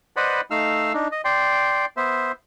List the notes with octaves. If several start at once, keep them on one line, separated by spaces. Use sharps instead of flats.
B4 C5 D5 D#5 F#5 B5
A3 D#4 F5 E6 F6
D4 D#4
D#5
D5 G5 C6
B3 C5 E5